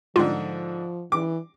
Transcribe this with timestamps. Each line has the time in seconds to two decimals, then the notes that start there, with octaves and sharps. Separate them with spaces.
0.16 G#2 D3 F3 F4
1.12 E3 D6